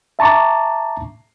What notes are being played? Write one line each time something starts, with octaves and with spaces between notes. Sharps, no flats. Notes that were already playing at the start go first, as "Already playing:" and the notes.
E5 A5 A#5 C#6 D6